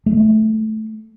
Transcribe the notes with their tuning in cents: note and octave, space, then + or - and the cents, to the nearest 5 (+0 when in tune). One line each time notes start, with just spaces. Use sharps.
A3 -10